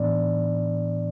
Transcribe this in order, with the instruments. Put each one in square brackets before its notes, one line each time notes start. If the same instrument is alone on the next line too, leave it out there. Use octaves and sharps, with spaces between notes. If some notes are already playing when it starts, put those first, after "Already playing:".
Already playing: [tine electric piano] A2 E3 B3 D4 D5